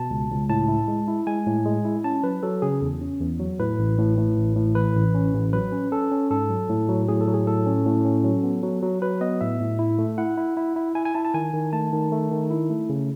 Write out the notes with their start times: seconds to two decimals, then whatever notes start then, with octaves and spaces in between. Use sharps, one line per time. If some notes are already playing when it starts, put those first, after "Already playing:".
Already playing: B2 A5
0.10 C#2
0.30 C#2
0.49 A2 A5
0.68 E4
0.88 G#3
1.08 E4
1.27 G#3 G#5
1.46 A2
1.66 G#3
1.85 E4
2.04 C#4 A5
2.24 F#3 B4
2.43 F#3 A4
2.62 C#3 G#4
2.81 E2
3.01 C#4
3.20 E2
3.40 F#3
3.59 A2 B4
3.79 A1
3.98 A2
4.17 A2
4.37 A1
4.56 A2
4.75 E3 B4
4.95 A1
5.14 C#4
5.33 A1
5.53 F#3 B4
5.72 C#4
5.92 C#4 A4
6.11 C#4
6.30 G#2 A4
6.50 F#3
6.69 A2
6.89 F#3
7.08 A2 G#4
7.21 A4
7.27 F#3
7.34 G#4
7.47 A2 A4
7.66 C#4
7.86 A2
8.05 C#4
8.24 F#3
8.44 B3
8.63 F#3
8.82 F#3
9.02 F#3 B4
9.21 B3 D#5
9.41 A2 E5
9.60 A2
9.79 E4
9.98 A3
10.18 E4 F#5
10.38 E4
10.57 E4
10.76 E4
10.95 E4 G#5
11.05 G#5
11.14 E4 A5
11.25 A5
11.34 D#3 G#5
11.53 D#3
11.73 A3 A5
11.93 D#3
12.12 A3
12.31 D#3
12.50 E4
12.70 A3
12.89 C#3